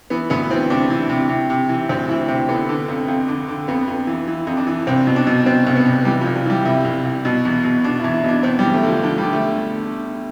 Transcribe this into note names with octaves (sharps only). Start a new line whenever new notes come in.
E3 B3
D2 B3
E3 C4
C3 D4
E3
C3
C3
C3
E3
D2 C4
E3 E4
C3 C4
D3 B3
D3
F2
F2
D3
D3
F2 B3
F2
E3
E3
F2
D4
E3
C2 C4
B2
D4
B2
B2 C4
C2
B3
C2
E3 G3
F3
C2
F3
E3 G3
C2 E4
C2
C2
B2
E2
B2
B2 D4
E4
E2
E4
B2 D4
E2 C4
G3
E2
A3
D3
F3
D3 F3
G3
D3
A3